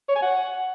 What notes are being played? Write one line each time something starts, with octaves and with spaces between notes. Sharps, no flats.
C#5
G#5
F#5